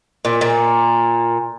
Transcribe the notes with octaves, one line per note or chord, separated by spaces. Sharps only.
A#2
A#2